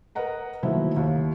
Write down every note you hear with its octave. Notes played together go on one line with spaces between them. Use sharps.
A#4 B4 D#5 F#5 A#5
D#3 F3 F#3 A3 A#3 E4
D#2